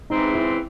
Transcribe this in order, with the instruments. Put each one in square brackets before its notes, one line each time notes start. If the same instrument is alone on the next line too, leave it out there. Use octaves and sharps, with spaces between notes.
[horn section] C#3 E3 G#3 C4 [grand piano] D#4
[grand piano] E4